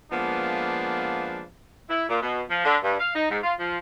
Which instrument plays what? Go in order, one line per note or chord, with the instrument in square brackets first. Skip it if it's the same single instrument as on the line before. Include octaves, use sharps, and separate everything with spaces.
[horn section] F3 G#3 A#3 B3 D4 B4
[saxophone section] E4
A#2
B2
F3
D3
G2
F5
D#4
G#2
F4
F3